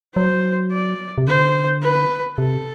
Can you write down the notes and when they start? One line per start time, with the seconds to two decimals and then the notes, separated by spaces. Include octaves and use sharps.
0.16 F#3 C5
0.72 D5
1.18 C3
1.27 D3 C5
1.83 B4
2.38 C3 A4